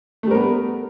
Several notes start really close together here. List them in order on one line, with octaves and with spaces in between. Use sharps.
A3 G3 A#4 B3